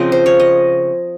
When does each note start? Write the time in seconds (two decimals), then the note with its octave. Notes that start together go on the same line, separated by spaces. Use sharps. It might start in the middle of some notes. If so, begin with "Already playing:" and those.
Already playing: C#3 F3 C4 D#5
0.12 C5
0.26 C#5
0.40 D#5